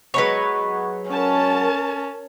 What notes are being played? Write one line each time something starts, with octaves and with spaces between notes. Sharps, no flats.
F#3 G#3 B3 B4 C#5
C#4 A#4 A5